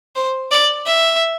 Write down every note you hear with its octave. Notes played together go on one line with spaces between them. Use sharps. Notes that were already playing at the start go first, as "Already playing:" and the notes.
C5
D5
E5